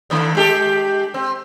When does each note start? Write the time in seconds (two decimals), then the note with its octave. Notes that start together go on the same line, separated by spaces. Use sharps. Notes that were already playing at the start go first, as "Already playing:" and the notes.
0.10 D3 D#3 A3
0.35 G#3 G4 A4
1.14 C4